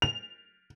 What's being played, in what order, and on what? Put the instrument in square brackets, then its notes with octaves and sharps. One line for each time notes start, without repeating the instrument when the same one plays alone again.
[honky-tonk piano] F7